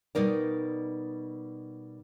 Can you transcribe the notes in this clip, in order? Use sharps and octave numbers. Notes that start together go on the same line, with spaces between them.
B2 G3 D#4 A#4 D5